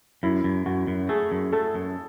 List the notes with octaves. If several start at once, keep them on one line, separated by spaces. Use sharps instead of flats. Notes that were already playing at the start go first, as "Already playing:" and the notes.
F#2 E4
F#2
F#2 F#4
F#2
A3 G#4
F#2
A3 A4
F#2